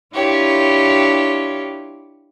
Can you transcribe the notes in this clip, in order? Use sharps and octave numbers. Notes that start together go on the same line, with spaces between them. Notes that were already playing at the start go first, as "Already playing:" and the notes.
D4 E4 F4 G4 C#5